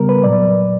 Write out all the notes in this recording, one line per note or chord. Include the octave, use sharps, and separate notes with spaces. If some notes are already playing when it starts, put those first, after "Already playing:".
Already playing: C#3 G3 B3 A#4
B4
A#2 F#3 D5